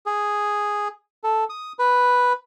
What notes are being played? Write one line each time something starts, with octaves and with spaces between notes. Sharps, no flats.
G#4
A4
D#6
B4